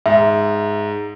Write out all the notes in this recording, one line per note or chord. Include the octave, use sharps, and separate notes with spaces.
G#2 E5